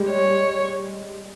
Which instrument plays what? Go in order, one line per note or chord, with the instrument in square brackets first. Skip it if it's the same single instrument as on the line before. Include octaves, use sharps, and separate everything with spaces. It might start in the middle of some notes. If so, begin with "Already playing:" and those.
Already playing: [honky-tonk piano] G3 G#3
[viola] C#5